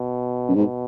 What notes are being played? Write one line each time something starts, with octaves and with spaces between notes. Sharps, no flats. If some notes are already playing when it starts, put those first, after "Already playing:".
Already playing: B2
F#2
G#2 B2